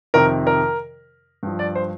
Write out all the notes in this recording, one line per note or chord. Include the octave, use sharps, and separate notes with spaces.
F2 C3 D#3 A#4
A#4
G2 F3
D5
C5